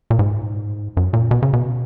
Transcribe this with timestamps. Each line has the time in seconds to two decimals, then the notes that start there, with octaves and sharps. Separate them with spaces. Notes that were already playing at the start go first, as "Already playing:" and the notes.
0.10 A#2
0.19 G#2
0.97 F#2
1.13 A#2
1.31 B2
1.42 C#3
1.53 B2